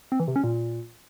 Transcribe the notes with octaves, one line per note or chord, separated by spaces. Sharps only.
C4
E3
C3
C#4
A#2